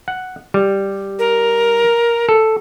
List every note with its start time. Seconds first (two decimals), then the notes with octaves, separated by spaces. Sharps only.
0.08 F#5
0.54 G3
1.19 A#4
2.29 A4